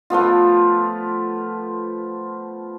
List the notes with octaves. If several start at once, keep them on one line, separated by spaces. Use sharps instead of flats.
F3 A3 B3 F4